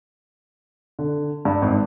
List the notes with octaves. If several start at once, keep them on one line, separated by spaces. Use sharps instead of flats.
D3
G2
G#1